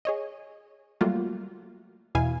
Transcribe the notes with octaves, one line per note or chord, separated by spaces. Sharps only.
G#4 C#5 D#5
F#3 G3 A3 A#3 F4 F#4
E2 B2 E4 F5 G#5